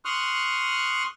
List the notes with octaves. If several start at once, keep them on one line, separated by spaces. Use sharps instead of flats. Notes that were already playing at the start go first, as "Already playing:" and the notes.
C6 C#6 D#6 F6 F#6